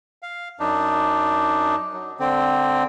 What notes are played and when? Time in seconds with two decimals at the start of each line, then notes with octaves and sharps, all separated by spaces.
0.22 F5
0.59 F#2 D4 D#4
1.93 F#3
2.19 D3 C4